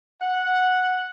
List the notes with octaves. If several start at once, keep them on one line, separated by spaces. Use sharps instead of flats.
F#5